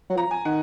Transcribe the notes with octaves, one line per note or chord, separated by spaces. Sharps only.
F#3
F3 A#5
G#5
D#3 F#5